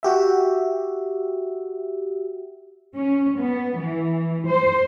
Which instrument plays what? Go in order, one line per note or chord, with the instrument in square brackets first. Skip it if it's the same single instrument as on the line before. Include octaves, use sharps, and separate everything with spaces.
[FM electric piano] F#4 G4 E5
[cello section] C#4
B3
E3
C5